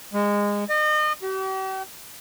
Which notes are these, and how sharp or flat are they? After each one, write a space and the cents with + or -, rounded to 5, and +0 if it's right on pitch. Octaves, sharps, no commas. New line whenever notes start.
G#3 -20
D#5 -35
G4 -45